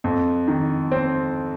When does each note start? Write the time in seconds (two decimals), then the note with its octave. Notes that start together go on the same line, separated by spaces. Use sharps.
0.04 F2
0.48 D#3
0.92 C4